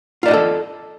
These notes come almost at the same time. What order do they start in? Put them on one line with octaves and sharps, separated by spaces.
F4 D5 D#5 F#4 A4